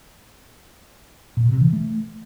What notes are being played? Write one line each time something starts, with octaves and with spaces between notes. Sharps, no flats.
A#2
C3
E3
A3